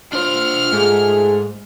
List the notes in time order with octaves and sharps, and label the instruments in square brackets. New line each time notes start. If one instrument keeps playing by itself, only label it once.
[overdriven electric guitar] D4 C5 [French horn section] F4 [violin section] F6
[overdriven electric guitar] G#2 [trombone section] A3 G#4